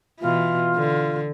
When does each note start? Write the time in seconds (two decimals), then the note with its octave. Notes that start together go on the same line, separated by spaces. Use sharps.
0.21 B2 E3 F4
0.75 D3